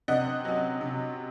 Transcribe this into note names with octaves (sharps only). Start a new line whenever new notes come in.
C3 D#5 F#5
F#3 C#4
C3